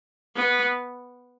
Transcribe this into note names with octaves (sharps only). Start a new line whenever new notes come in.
B3